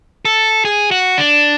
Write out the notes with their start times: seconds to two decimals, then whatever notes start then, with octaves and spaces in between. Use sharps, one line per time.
0.25 A4
0.65 G#4
0.91 F#4
1.18 D4